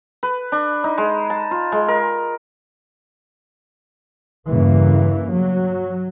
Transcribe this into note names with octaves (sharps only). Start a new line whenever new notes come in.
B4
D4
D#4
G#3
A5
F4
G#3
A#4
E2 G2 C#3 E3 A#3
F#3